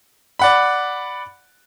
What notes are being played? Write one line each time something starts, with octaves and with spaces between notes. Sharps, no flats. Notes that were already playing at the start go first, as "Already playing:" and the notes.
D5 F#5 B5